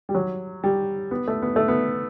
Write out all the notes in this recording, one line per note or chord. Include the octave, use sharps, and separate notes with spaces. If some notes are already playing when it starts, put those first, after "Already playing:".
G3
F#3
G3
B3
A3
B3
A3
B3